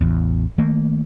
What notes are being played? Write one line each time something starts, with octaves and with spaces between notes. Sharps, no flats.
A1 E2
D#3 A3 A#3